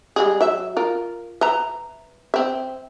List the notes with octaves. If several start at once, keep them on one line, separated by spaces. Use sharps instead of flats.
G3 G#3 G#4
F#3 E5
F4 A#4
B4 E5 A#5
C4 E5